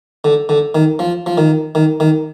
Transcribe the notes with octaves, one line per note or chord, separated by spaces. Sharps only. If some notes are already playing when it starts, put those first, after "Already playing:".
D3
D3
D#3
F3
F3
D#3
D#3
D#3